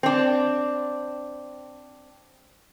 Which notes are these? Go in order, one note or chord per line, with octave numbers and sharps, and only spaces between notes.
C4 D4